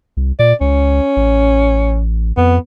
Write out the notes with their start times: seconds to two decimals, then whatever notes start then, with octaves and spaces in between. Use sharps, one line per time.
0.17 C2
0.39 A#2 D5
0.61 C#2 C#4
1.17 A1
2.37 F2 B3